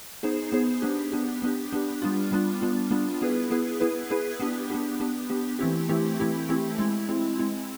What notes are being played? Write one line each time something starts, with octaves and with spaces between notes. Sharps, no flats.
B3 D#4 G#4 C5
B3 D#4 G#4 C5
B3 D4 G4
B3 D4 G4
B3 D4 G4
B3 D4 G4
G3 B3 D4 F4
G3 B3 D4 F4
G3 B3 D4 F4
G3 B3 D4 F4
B3 E4 G#4 B4
B3 E4 G#4 B4
B3 E4 G#4 B4
B3 E4 G#4 B4
B3 D4 G4
B3 D4 G4
B3 D4 G4
B3 D4 G4
E3 A3 C4 E4 G4
E3 A3 C4 E4 G4
E3 A3 C4 E4 G4
E3 A3 C4 E4 G4
G#3 C4 E4
G#3 C4 E4
G#3 C4 E4